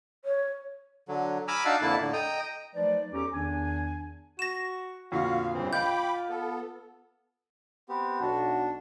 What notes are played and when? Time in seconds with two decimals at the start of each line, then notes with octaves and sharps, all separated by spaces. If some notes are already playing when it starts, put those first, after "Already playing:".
0.25 C#5
1.08 D3 F#3
1.48 G#5 A#5 B5 D6 E6 F6
1.65 D4 D#4 F#4 F5 A5 E6
1.82 F2 D3 A#3 E4 A5
2.00 A2 D3
2.13 D#5 G5 A#5
2.75 F3 F#3 A3 D#4 B4 D5
3.13 E2 C#4 G4 A4 A#5 D6
3.32 E2 D#3 D4 G#5
4.39 F#4 A#6 E7
5.12 F2 A#2 D3 F#4 F5
5.54 G2 C#3 E3 C4
5.73 F4 D#5 G5 B5 D6 G6
6.29 B3 A4
7.89 B3 C4 G4
8.20 B1 D4 F#4